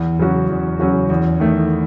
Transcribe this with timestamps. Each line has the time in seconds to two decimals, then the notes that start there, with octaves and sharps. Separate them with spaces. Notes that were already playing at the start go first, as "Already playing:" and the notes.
Already playing: E2
0.19 C#3 F#3 C#4 F#4
0.49 E2
0.80 C#3 F#3 C#4 F#4
1.10 E2
1.40 D#3 A3